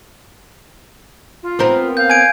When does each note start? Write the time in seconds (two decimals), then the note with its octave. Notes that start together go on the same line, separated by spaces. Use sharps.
1.43 F4
1.59 B3 C4 A#4
1.97 F5 G6
2.10 G#5 G#6 D7